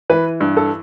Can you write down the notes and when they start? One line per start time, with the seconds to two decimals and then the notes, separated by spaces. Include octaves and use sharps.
0.10 E3 B4
0.40 G2
0.57 A4